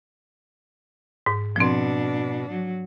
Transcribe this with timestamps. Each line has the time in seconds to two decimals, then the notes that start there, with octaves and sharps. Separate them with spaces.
1.26 G#2
1.56 B2 F3 C4 D4
2.50 F#3